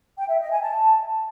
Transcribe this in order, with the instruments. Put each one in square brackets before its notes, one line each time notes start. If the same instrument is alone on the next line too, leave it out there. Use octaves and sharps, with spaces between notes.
[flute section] G5
E5
D#5
G#5
A5